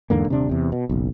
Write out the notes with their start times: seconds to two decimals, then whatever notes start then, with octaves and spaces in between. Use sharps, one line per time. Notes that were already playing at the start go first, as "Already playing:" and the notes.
0.10 E2 G#2 D3 A#3
0.28 D#1 C3 D4
0.49 E2 C3
0.72 B2
0.89 F#1 B1